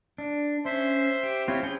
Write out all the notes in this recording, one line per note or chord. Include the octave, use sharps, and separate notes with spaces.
D4
C#4 C5 E5 C6
G4
C4 E4 F4 C#5
C#4 G#4 G6